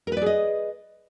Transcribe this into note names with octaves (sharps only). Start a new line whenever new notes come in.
G#4 A#4 B4 D5 D#5